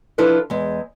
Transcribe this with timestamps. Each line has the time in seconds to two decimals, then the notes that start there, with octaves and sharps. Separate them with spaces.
0.18 F3 D4 E4 F4 A4 B4
0.50 E2 G#3